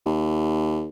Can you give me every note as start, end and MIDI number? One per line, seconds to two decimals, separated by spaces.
0.06 0.89 39